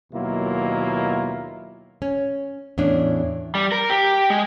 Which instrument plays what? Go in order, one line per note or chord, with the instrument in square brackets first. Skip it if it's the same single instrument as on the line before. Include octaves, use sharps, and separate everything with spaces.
[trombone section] D#2 B2 F#3 A#3 E4 F4
[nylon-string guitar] C#4
E2 A2 C#4 D4
[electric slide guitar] G3
A#4
G4
G#3